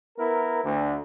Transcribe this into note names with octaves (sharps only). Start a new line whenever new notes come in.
B3 E4 A#4
D2